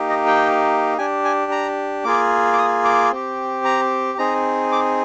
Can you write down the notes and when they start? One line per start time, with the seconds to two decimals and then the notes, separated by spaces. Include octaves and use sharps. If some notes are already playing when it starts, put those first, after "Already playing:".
Already playing: A#3 D#4 G4
0.09 D#5
0.27 G5
0.98 D4 G4 G#5
1.25 G#5
1.52 A#5
2.04 A#3 F4 G#4 D6
2.53 D6
2.58 D#6
2.85 D6
3.12 C4 G4
3.65 A#5
4.18 C4 D#4 G#4 A#5
4.72 D6